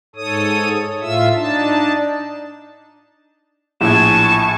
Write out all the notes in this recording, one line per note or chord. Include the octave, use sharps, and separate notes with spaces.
G#2 A4 C#5 D#6
A2 F4 E5 E6
D4 D#4 A5
A#1 A2 G#5 A5 C#6 E7